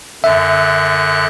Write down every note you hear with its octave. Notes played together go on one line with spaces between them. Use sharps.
F#2 D3 E5 F#6